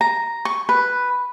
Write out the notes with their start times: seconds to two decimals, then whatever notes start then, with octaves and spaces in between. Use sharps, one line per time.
0.01 A#5
0.45 C#6
0.69 B4